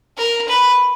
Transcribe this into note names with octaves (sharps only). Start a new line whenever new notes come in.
A#4
B4